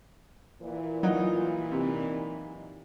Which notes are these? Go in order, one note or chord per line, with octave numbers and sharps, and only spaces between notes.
A#2 E3
F#3 D#4 F4
C3 D#4